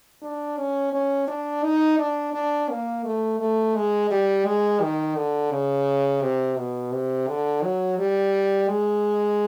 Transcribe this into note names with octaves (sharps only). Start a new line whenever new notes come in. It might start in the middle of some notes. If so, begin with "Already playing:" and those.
D4
C#4
C#4
D4
D#4
D4
D4
A#3
A3
A3
G#3
G3
G#3
D#3
D3
C#3
C3
B2
C3
D3
F#3
G3
G#3